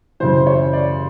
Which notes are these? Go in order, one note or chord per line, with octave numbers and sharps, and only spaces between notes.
F#2 C#3 E3 C5
C#5
D5